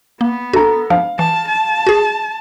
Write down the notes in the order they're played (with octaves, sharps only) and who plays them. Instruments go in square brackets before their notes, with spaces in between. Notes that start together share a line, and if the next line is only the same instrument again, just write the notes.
[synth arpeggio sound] A#3 [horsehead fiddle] B3
[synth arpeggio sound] F#4 [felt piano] A4 A#5
[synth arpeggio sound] F3 [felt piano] F5
[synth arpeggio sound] E3 [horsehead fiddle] A5
[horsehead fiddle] A5
[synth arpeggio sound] F#4 G#4